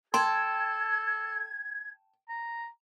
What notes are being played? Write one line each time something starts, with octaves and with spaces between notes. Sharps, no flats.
A4 G5 A5 C6 G#6
A#5